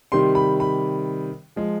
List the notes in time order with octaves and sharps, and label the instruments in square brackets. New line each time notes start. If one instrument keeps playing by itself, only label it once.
[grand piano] C3 D#3 G3 C6
B5
B5
F3 G#3